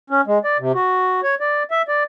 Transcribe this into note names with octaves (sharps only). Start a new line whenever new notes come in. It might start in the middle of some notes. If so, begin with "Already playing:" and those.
C#4
G#3
D5
C3
F#4
C#5
D5
E5
D5